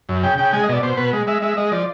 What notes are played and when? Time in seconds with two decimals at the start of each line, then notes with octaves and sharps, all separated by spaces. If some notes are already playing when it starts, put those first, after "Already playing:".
0.09 F#2
0.23 C#3 G5
0.38 C#3 G5
0.53 G#3 G#5
0.63 D#5
0.69 B2 D5
0.83 B2 C5
0.97 B2 B4
1.13 G#3
1.27 G#3 E5
1.42 G#3 E5
1.57 G#3 D#5
1.72 F3 D5